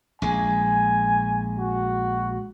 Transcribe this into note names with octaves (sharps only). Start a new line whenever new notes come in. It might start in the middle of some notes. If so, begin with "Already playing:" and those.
A#1 G#3 G#5
F#4